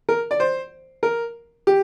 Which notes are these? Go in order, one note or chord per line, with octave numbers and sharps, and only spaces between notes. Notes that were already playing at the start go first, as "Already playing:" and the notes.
A#4
D5
C5
A#4
G4